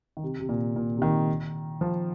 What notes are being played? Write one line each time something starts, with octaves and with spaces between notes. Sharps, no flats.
D#3
C3
C3
A#2
A#2
C3
D#3
F3